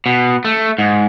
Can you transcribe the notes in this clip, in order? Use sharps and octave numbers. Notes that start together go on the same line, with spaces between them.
B2
A3
G#2